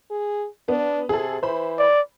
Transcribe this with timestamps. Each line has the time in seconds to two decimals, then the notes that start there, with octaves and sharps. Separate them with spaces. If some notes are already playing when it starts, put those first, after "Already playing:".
0.11 G#4
0.69 B3 D4
1.09 C3 G#4 A4
1.43 E3 C5 B5
1.79 D5